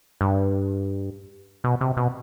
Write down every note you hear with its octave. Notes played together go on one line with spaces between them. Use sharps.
G2
B2
C3
B2